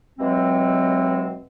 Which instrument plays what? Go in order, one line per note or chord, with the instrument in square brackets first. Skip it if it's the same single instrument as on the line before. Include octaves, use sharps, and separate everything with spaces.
[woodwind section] D#2 B2 E3 F#3 G#3 C4